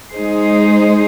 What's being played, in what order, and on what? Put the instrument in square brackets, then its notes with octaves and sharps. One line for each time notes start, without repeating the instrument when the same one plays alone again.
[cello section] G#3 D#4 G#4 C5